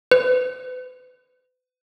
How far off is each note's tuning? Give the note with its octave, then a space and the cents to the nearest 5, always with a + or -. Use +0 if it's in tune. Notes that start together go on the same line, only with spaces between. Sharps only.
B4 +40